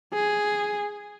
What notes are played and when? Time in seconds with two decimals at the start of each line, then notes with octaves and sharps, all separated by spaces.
0.14 G#4